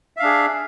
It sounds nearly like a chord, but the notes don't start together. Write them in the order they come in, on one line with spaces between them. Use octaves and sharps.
E5 F5 D4 G#4